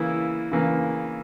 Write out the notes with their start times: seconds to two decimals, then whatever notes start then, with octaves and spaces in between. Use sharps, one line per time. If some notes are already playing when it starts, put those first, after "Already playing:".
Already playing: C#3 E3 A#3 E4
0.52 C#3 E3 A#3